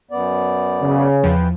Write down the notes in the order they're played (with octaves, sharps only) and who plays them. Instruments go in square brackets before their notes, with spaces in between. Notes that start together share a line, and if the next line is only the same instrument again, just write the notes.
[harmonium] F#2 B3 D5
[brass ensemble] C#3
[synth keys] E2 F3 [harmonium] B4 G5